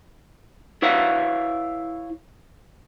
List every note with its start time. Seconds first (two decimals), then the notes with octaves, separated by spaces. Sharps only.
0.82 E4 B4 C#5 F5 F#5